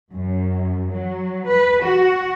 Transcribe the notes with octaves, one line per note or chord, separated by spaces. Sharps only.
F#2
F#3
B4
F#4